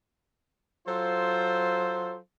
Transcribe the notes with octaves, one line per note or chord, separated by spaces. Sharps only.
F#3 F4 A4 C5